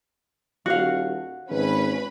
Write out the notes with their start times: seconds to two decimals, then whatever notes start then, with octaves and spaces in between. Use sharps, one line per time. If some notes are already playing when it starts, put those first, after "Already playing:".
0.66 D#1 F#4 F5
1.50 G#1 C#4 B4 B5